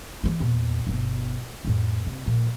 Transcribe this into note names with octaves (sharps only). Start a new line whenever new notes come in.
E3 G#3
E2 A#2
G1 B2
F2 A2
C3
A#2 F3